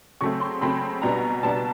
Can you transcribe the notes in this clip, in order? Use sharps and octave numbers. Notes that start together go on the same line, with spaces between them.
C#3 F#3 A3 C4 C#6
C6
C#3 F#3 A3 C4 B5
B2 G3 B3 D4 A#5
B2 G3 B3 D4 A5